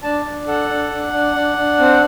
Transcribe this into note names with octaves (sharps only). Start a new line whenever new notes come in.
D4 A5
D4
A4 F#5
D4
D4
D4
D4
D4
C4